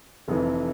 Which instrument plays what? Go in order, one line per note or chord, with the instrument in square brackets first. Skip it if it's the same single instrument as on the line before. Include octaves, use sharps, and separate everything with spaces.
[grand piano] F1 F2 E3